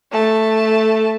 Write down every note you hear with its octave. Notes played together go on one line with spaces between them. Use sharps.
A3 A5